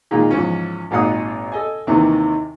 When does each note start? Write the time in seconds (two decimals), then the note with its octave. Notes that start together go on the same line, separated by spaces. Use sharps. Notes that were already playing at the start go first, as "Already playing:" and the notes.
0.11 A#2 D#3 G#3 F4
0.31 E2 G#2 F3 C#4
0.91 G#1 A#2 D#4 F5 F#5 D#6
1.52 A4 D#5 G#5
1.87 D#2 C3 D#3 E3